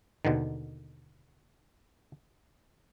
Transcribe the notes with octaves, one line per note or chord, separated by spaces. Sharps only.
D#2 B2 D3 D#3